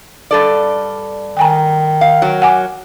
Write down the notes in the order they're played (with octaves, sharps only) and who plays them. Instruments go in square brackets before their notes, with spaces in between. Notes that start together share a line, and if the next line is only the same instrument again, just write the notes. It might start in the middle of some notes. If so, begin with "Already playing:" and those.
[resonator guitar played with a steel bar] G2 A4 D5
[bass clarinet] D#3 [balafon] G5 G#5 A#5
[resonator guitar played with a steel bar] F5
F#3 A#4
[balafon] F#5 G#5 D6